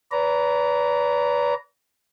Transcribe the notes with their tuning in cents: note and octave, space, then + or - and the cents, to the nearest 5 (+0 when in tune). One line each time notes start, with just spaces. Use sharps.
B4 +0 D5 -40 A#5 +0